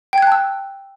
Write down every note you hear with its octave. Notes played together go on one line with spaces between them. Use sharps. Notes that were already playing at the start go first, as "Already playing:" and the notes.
G5 A5 E6 F#6 G#6